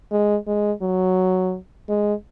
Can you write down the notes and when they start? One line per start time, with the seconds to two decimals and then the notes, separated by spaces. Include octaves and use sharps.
0.11 G#3
0.47 G#3
0.82 F#3
1.89 G#3